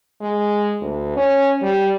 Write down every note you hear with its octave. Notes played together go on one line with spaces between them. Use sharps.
G#3
D2
C#4
G3